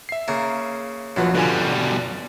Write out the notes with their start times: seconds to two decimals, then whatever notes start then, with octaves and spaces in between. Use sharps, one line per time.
0.09 E5 C7
0.28 C#3 A#3
1.16 A#1 F#2 F3 B4
1.35 B2 D3 G3 F4 G#5